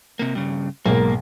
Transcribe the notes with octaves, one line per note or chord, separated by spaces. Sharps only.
C3 A#3
G2 C#3
B1 G#2 A#3 A#4